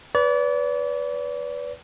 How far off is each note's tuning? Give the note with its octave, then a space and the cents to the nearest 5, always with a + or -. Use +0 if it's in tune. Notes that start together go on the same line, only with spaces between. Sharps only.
B4 +0 D5 -35